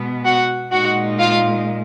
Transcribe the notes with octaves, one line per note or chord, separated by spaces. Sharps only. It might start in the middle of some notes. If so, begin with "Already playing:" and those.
Already playing: B2 G#3 B3
F#4 F#5
A#2 G#3 D#4 F#4 F#5
F4 F5